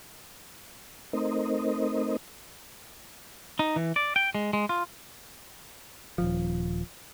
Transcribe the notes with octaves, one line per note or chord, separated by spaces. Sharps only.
A3 C4 D#4 A#4 C5 D#5
D#4
E3
D5
G5
G#3
G#3
F4
D#1 A#1 F3